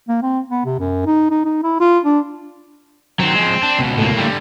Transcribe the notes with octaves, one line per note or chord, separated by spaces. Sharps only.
A#3
C4
B3
C3
F#2
D#4
D#4
D#4
E4
F4
D4
D#3 F#3 C4
F3 G#3
D4
C#2 B2
A2 A#3
D3 G3